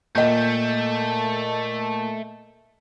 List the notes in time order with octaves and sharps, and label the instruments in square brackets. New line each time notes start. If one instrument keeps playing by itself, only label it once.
[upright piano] A#2 [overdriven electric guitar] A3 [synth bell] D#5 G6